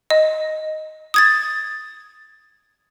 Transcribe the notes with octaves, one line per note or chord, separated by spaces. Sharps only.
D#5
D#6 G#6 A6